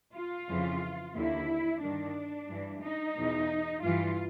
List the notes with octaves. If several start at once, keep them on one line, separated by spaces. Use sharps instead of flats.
F4
F2 C#3 E3
D#2 D3 E4
G2 D#3 D4
G2 E3
D#4
E2 B2
G2 E3 F4